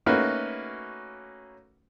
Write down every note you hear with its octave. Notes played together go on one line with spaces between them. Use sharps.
A3 A#3 C#4 D#4 F#4 B4